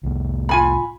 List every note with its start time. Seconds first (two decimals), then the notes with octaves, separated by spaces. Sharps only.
0.03 C2 A2
0.49 F4 G#5 B5